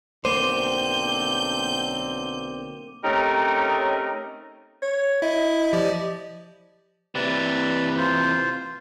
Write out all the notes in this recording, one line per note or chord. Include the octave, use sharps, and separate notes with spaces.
B1 D3 A#3 C4 C5 D6 G6 D#7
A3 C4 C#4 D#4 G4 A#4
C#5
E4 D#5 E5
F3 G4 D5
C3 E3 B4 D5
F4 C5